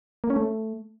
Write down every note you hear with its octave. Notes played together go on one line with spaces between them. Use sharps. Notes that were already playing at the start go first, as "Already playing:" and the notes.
A#3
C#4
A3